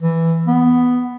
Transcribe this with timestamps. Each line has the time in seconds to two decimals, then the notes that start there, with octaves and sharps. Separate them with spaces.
0.01 E3
0.47 B3